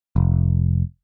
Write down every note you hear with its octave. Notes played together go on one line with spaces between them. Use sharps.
F1